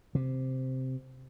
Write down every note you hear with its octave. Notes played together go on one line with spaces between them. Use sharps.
C3